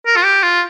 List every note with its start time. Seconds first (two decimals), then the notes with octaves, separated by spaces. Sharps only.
0.06 A#4
0.16 F4
0.24 G4
0.43 F4